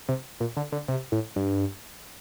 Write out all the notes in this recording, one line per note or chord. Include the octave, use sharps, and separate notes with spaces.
C3
A#2
D3
D3
C3
A2
G2